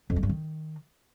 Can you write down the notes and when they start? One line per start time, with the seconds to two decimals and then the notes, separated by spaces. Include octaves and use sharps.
0.10 F2
0.16 G#3
0.23 G2
0.29 D#3